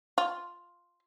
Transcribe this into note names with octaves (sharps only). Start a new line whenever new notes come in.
F4